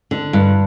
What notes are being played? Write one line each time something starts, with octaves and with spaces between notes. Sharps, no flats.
D3
G2